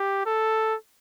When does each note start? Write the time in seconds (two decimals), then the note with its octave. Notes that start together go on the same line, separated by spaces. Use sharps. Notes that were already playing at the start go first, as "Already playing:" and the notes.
Already playing: G4
0.26 A4